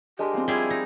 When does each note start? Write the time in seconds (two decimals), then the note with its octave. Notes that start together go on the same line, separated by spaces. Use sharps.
0.19 G#3 D4 G4 A#4
0.33 F3 C4
0.48 G3 E4 F4 G#4
0.70 D#4